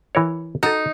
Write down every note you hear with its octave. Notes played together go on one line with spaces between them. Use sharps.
E3 A#4 C#5
D#4 F#4 A4